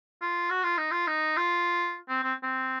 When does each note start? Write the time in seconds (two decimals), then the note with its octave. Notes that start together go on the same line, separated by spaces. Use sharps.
0.22 F4
0.50 F#4
0.63 F4
0.77 D#4
0.91 F4
1.07 D#4
1.37 F4
2.09 C4
2.23 C4
2.43 C4